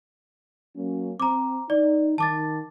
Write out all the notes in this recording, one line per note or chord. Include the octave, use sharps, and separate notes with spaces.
F#3 A#3 C#4
C4 A#5 D6
D#4 D5
D#3 A5 D6 A6